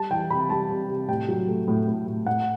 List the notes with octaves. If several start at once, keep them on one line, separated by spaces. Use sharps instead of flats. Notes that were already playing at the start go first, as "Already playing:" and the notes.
Already playing: G3 A5
E3 G5
C3 B5
G3 A5
C3
C3
A2 G5
F#3
A3
A2
A2
A2
A2 F#5